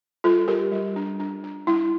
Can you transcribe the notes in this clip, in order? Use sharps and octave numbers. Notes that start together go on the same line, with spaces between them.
G3 F4 A4
G3 G4 A#4
G3
D4
D4
D4
G3 E4